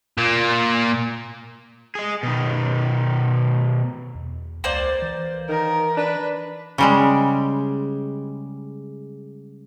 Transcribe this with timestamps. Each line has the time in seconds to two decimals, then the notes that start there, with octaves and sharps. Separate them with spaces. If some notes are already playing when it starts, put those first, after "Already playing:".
0.18 A#2 A#3
1.95 G#4 D#5
2.23 B2 D#3
4.15 E2
4.64 C#2 A#3 C5 D5
5.02 E3
5.49 D#3 A#4
5.97 D4 B4
6.78 C#3 G3 G#3